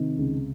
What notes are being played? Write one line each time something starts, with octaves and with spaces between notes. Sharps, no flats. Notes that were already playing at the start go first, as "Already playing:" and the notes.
Already playing: C3 D#3
C#2